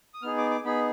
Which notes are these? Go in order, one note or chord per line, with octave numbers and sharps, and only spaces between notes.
D#6
B3 D#4 G#4 F6
D6
D6
B3 D#4 G#4 B5